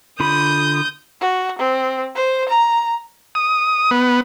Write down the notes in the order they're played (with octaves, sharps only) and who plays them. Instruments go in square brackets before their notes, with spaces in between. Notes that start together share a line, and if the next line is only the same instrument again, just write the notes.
[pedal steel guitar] D3 F4 B5 [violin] D#6 G6
[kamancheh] F#4
C4
C5
A#5
[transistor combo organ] D#6
B3